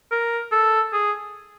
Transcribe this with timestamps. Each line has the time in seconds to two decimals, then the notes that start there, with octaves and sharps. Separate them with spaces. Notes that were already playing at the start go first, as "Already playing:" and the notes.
0.11 A#4
0.52 A4
0.93 G#4